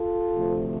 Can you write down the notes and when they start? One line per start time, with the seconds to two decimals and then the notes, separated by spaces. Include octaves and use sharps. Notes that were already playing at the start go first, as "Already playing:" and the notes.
Already playing: F4 A4
0.34 D2 C3 F3 A3